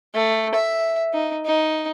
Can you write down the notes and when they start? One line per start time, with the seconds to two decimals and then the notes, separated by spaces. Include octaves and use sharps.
0.14 A3
0.55 E5
1.13 D#4
1.46 D#4